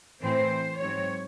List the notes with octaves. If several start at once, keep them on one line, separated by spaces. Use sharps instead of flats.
A2 E3 C4 C5
G#2 F#3 C4 C#5